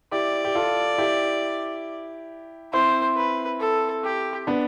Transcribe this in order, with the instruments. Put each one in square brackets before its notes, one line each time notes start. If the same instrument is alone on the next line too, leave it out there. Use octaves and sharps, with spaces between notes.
[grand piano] E4 G4 [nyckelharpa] D5
[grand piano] G4
F4 A4
E4 G4
[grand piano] C4 E4 [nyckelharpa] C5
[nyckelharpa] B4
A4
G4
[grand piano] B3 D4